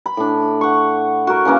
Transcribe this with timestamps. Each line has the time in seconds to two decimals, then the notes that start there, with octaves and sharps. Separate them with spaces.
0.06 B5
0.17 A2 D4
0.61 F#5 C#6
1.27 F#4 A#4
1.45 C#3 E3 A#3 C#4